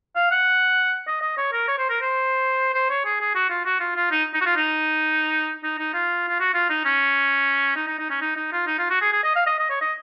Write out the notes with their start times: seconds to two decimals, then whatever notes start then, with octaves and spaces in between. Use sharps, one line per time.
0.15 F5
0.31 F#5
1.07 D#5
1.21 D#5
1.38 C#5
1.52 A#4
1.68 C#5
1.78 C5
1.90 A#4
2.01 C5
2.74 C5
2.90 C#5
3.05 G#4
3.20 G#4
3.35 F#4
3.50 F4
3.65 F#4
3.80 F4
3.96 F4
4.11 D#4
4.34 D#4
4.41 F#4
4.46 F4
4.57 D#4
5.63 D#4
5.78 D#4
5.94 F4
6.28 F4
6.40 F#4
6.54 F4
6.69 D#4
6.85 C#4
7.76 D#4
7.87 D#4
7.98 D#4
8.10 C#4
8.21 D#4
8.36 D#4
8.52 F4
8.67 D#4
8.79 F4
8.90 F#4
9.01 G#4
9.13 G#4
9.24 D#5
9.36 F5
9.47 D#5
9.59 D#5
9.70 C#5
9.81 D#5